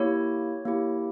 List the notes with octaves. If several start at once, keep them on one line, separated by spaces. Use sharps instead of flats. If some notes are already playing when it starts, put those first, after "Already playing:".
Already playing: A#3 E4 G4 C#5
A#3 E4 G4